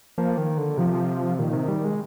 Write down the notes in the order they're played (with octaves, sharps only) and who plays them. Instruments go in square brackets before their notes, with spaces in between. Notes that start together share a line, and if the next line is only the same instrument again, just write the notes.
[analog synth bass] F3 [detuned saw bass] A#3
[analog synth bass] D#3
D3
[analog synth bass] C3 [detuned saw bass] F3
[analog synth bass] A#2 [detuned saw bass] D#3
[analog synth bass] C3
G3
G#3